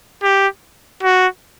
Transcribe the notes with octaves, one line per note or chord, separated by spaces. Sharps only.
G4
F#4